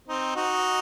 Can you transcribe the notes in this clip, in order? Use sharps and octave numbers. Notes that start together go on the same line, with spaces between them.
C4 D#4
D#4 F#4